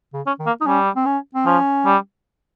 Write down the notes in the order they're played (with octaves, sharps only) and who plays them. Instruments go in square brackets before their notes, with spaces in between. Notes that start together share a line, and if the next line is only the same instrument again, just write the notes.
[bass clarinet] C#3
[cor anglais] C#4
[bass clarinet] D#3
[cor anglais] A#3
[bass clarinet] D#4
[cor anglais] G3 [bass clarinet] C#4
[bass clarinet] C4
C#4
C4
[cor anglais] F3 [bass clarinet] C#4
[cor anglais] G3